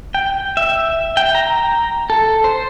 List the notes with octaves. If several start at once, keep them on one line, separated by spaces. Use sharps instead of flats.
G5
E5
G5
A#5
A4
C5